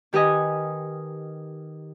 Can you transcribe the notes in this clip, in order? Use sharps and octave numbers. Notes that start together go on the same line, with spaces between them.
D#3 G4 B4 D#5 G#5